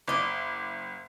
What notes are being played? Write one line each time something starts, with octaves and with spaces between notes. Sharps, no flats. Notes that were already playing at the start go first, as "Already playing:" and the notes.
F#1 D5 D#5 D6